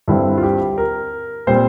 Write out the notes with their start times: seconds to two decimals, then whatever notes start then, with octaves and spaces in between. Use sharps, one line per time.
0.08 G2 D3 G3 C4 E4
0.37 F4
0.43 G4
0.78 A#4
1.47 A#2 G3 C4 C5